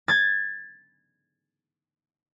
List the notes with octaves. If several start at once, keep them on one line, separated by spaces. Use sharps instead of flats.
G#6 A6